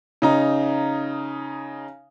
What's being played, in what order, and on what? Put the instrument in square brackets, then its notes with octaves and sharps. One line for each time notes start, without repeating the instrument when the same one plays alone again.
[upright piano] C#3 D#4 A#5